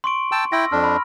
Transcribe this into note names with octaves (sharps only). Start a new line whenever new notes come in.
C6 C#6 D7
G5 A5 E6
E4 G5 C6 E6 A#6
F2 D4 F6
B5